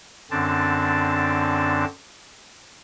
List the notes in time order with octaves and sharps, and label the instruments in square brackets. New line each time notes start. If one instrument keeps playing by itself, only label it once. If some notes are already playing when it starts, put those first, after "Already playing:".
[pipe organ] F#2 D3 C4 D4 A5